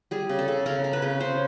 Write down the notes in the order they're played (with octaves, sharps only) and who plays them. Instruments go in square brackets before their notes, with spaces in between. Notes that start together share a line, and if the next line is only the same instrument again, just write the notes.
[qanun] G3 G#4
C#3
A4
C#3
C#3 A#4
C#3
B4
C#3
C#3 C5